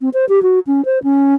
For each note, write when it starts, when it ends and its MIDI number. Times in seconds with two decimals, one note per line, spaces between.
0.01 0.09 60
0.14 0.25 72
0.29 0.42 67
0.43 0.59 66
0.67 0.84 61
0.85 0.99 72
1.04 1.34 61